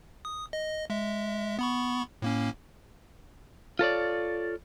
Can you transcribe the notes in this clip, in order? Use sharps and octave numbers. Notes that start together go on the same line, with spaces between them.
D#6
D#5
G#3 E5
B3 B5 C#6
A2 A#3 C#4
F4 A4 C#5 D5